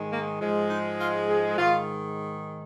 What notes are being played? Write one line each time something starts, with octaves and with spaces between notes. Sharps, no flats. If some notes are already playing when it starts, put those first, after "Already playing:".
Already playing: G#2 D#3 G#3
A#3
G#2 F3 G#3
D#4
F4
G#4
G#2 D#3 G#3 F4